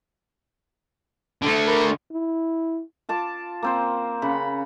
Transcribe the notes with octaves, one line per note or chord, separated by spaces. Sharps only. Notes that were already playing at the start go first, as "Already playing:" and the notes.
D3 A3
A#4 B5
E4
F4 A5 D6
A#3 C4 C5
C#3 F#5 B5